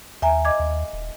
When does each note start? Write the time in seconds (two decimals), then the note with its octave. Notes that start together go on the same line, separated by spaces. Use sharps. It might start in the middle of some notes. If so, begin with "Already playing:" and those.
0.22 D#2 E5 G#5 A#5
0.45 D#5 D6 G#6
0.60 D#2
0.93 D#1